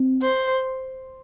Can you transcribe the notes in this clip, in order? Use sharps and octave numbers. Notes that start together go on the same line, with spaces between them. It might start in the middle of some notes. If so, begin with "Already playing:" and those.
Already playing: C4
C5